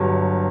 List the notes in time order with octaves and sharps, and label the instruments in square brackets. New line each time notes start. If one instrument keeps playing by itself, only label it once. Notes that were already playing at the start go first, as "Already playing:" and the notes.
Already playing: [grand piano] G1 G2 F#3